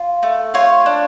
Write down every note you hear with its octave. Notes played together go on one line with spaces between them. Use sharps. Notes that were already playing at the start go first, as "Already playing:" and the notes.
Already playing: F4
A3
F4 C#5
D4